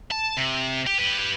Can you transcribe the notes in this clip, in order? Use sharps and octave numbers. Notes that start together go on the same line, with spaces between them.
A5
C3
G4
G4 B4